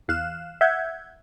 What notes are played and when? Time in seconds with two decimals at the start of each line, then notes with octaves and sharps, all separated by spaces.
0.08 E2 F5 F#6 E7
0.61 E5 F#5 G6 G#6